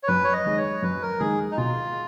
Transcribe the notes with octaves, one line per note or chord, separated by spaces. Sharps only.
C#5
F#2 B4
C#5
D#5
D#3 G#3
C#5
F#2 B4
A#4
D#3 G#3 G#4
D#4
B2 F4